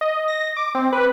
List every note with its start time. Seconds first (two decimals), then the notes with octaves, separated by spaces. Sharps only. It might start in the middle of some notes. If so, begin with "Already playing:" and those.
0.01 D#5
0.28 A#6
0.56 D6
0.75 C4
0.93 B4